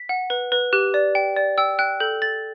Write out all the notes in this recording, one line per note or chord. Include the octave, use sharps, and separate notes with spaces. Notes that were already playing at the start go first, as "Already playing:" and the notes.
Already playing: B6
F#5
B4
B4
G4 F#6
D5
G5
D5
G5 E6
G5 F#6
A4 G6
A4 A6